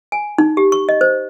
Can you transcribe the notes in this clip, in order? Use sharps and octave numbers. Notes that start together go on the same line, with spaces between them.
G#5
D#4
G4
C#6
D#5
C5